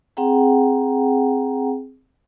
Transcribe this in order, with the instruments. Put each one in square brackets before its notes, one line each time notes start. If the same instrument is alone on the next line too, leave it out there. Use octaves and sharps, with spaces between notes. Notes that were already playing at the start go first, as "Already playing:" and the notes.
[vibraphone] C4 G#4 F#5 G5 A#5